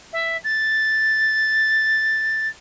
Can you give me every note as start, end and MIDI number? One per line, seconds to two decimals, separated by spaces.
0.13 0.37 76
0.44 2.48 93